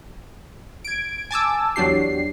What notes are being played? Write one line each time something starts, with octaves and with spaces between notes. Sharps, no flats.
G#6 D7
G#5 A5 D6 E6
E2 F#3 D4 G4 C7